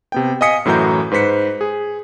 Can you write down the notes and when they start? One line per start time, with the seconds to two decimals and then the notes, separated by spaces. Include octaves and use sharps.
0.12 C3 B3 G5
0.41 D#5 F5 G#5 D#6 B6 C#7
0.65 F#2 A2 E3 F#4 A#5 G6
1.11 G#2 B4 C5 B6 C#7
1.61 G#4